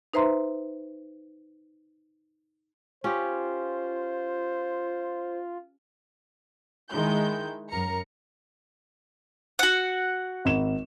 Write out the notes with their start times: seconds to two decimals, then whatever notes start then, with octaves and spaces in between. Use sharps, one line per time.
0.14 D#4 B4 C5 E5 A#5 C6
3.04 C#4 F4 G4 C5
6.91 D#3 G#3 E4 G6
7.70 F#2 A#4 A#5 C#7
9.59 F#4 F#5
10.45 G#1 E7